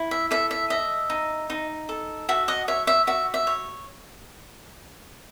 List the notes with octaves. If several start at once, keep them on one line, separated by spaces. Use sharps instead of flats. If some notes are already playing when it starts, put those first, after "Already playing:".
Already playing: E4
E5
A4 E5
E5
D#5 E5
D#4
D#4
A4
F#4 E5
D#5 F#5
C#5 E5
E5
F#4 E5
E5
C#5